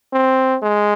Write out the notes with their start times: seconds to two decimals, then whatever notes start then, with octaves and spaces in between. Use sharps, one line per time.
0.13 C4
0.62 G#3